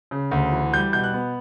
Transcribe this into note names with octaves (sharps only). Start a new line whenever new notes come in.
C#3
D2
E3
G3 G6
B2 G6
F#6
B3